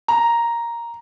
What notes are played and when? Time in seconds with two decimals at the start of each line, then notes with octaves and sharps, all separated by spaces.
0.08 A#5